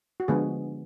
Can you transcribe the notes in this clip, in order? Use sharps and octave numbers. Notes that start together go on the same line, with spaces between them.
F#4
D3 F3 G#3 B3 G#4